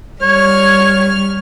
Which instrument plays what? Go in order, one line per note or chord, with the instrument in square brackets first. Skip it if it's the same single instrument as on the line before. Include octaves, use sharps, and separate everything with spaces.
[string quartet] G3 F6 [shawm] C#5